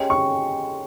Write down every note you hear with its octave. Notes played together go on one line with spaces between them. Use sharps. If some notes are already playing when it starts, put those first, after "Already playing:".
Already playing: G#3 C#4 G4
C#6